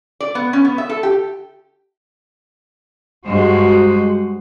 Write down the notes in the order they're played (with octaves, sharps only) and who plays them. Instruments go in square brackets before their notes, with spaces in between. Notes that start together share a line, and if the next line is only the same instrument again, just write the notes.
[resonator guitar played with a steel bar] D5
B3
C#4
B3
E5
A4
G4
[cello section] G2 G#3 F#4 C5